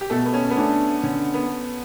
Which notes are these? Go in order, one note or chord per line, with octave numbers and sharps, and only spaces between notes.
G4
B2 A3 A4
B3
C#4
B3
A3 C#4 D4
D3 C#4
B3